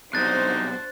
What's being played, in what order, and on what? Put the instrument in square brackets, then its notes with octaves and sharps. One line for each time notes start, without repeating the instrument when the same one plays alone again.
[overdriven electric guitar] B1 C3 [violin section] D4 F#4 C5 [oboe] D#4 [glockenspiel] F#6 A6